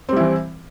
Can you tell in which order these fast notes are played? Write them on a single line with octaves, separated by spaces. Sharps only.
C4 G3 E4 E3